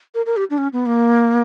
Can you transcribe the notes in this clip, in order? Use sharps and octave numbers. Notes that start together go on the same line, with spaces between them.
A#4
A#4
G4
D4
C#4
B3
A#3